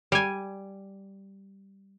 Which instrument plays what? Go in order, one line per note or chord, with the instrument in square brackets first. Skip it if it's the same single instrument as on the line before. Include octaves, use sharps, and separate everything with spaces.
[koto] G3 G#5